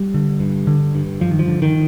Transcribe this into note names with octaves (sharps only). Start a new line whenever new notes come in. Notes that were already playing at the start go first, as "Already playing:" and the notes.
Already playing: G3
D3
G2
D3
G2
G2 F3
D#3
F3
D3
D#3